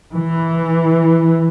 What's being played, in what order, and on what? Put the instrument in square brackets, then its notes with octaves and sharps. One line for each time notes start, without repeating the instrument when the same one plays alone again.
[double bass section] E3